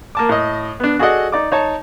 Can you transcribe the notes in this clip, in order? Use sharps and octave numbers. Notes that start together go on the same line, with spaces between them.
A#3 A5 D6
A2 D#5
B3 D4
F#4 G#4 A4 D5 D#5 F#5
D#4 D5 D6
D#4 C#5 A5